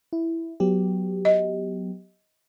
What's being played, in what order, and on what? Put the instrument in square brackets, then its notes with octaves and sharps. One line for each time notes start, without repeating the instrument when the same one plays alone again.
[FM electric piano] E4
F#3 B3 G4
[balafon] D#5